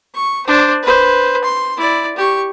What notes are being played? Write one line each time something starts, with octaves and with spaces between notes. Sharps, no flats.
C#6
D4 C5
B4 C5
C6
E4 D5
G4 C#6